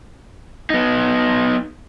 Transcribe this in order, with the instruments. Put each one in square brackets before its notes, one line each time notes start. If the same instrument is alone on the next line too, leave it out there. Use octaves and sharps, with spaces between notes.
[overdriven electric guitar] B3 D#4